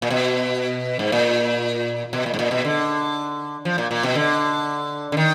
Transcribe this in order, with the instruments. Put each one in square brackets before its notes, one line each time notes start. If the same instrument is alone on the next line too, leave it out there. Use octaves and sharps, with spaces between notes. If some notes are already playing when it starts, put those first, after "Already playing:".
[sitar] A#2
B2
G#2
A#2
B2
A#2
G#2
A#2
B2
D3
F3
A#2
A#2
B2
D3
D3
D#3